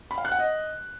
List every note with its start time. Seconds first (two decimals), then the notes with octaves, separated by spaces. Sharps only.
0.11 B5
0.18 F5
0.25 F#6
0.32 F#5
0.39 D#5